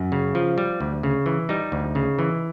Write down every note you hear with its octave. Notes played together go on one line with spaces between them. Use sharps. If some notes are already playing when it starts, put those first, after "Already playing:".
Already playing: F#2
C#3
F3
G3
D2
C#3
E3
G3 D#4
D2
C#3
E3